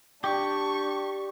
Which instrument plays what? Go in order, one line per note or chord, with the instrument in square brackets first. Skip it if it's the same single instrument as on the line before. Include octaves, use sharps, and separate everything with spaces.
[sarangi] D4 [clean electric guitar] G4 [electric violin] C#6